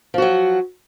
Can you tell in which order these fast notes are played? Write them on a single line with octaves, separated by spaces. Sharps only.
F3 F#4 F#3